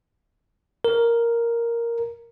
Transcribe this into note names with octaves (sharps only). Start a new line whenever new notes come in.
A#4